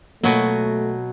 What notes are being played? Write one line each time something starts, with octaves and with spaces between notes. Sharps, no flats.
B2 F#3 A3 A#3